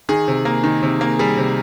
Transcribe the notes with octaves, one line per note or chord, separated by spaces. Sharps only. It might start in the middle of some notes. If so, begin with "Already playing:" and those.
D#3 G#4
C3
A#3
D#3
C3
A#3
G3 G#4
C3